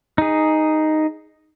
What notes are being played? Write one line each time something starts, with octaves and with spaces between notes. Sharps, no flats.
D#4 G#4